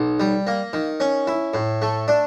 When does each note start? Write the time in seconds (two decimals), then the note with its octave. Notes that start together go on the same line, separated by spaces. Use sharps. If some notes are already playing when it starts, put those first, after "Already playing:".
Already playing: B1
0.20 G3
0.47 A#3
0.73 D#3
1.00 C#4
1.27 E4
1.54 A2
1.82 A3
2.08 D4